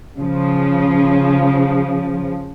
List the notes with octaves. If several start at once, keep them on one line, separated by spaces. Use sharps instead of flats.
C#3 F3